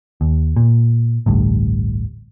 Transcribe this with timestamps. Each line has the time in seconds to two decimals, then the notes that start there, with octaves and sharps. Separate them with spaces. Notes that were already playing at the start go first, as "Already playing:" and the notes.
0.21 D#2
0.56 A#2
1.26 A1 D2 G2